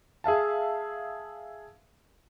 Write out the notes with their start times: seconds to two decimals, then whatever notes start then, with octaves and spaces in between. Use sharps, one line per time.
0.24 G#4 E5 F5 A5